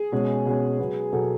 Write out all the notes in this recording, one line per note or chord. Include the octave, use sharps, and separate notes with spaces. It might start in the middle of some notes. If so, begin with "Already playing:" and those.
Already playing: G#4
B2 G#3 C#4
B2 G#3 C#4
B2 F#3 B3
B2 F#3 B3 A4